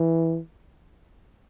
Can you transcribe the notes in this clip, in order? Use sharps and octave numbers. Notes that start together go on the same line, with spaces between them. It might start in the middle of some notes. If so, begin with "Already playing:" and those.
Already playing: E3